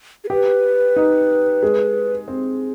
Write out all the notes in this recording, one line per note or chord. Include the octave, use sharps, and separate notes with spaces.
G#4
G4 B4
D#4
G#3
C4